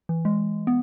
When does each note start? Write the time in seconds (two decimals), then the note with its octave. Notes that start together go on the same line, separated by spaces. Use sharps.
0.09 E3
0.25 G#3
0.67 B3